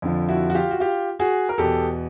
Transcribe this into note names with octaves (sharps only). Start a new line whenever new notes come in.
F2 D3 F3
E4 F#4
F#4
F4 G4
F#4
F4 G4
F#4 G#4
A#4
E2 B2 G4 A4